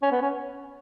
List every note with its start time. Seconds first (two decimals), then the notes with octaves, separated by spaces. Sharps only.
0.02 C#4
0.12 B3
0.21 C#4